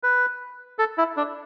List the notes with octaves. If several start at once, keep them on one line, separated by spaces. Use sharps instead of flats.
B4
A4
E4
D4